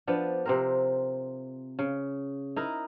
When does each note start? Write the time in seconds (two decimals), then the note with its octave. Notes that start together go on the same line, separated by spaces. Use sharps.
0.07 F3 B3 D4
0.46 C3 C4 A#4
1.79 C#3
2.56 D#4 E4 A#4 D#5